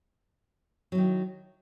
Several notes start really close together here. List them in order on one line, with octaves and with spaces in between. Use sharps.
F#3 E4 D#3